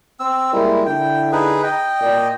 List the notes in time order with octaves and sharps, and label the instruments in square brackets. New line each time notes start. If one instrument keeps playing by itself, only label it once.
[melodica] C4 E6
[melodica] G3 G#3 [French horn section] A#3 E4 A#4
[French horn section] D3 E4 [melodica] G5
[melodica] D#4 G#4 B4
D#5 G5
[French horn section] A#2 A#4 D5